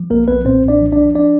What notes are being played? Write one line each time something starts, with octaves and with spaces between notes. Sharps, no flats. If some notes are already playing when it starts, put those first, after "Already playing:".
Already playing: F3
B1 A#3 A#4
B1 B3 B4
A#2 C4 C5
B1
D4 D5
F3
D4 D5
F3
D4 D5